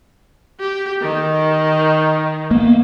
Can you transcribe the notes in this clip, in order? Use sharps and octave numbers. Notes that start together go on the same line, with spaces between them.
G4
D#3
A#3 B3